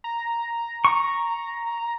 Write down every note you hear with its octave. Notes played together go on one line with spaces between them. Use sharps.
A#5
C#6